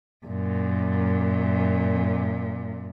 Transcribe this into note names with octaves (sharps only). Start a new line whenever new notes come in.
F#2 A#2